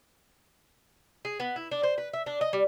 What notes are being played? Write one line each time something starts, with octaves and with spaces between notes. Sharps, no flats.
G#4
B3
E4
D4
C5
B4
E5
D4
D#5
G3